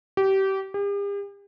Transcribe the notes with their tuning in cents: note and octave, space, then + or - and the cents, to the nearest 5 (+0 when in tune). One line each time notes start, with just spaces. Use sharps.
G4 -25
G4 +45